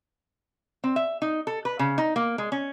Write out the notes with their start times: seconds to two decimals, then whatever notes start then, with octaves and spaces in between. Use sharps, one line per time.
0.84 C4
0.96 E5
1.22 D#4
1.47 A4
1.65 B4
1.79 C#3
1.98 D#4
2.16 A#3
2.38 G#3
2.52 C#4